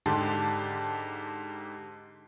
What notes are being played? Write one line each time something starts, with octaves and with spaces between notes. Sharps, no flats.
G#2 D3 G4 A5 C6